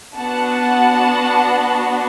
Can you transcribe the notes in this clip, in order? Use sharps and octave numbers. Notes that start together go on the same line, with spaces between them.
B3 D4 F#4 F#5 A5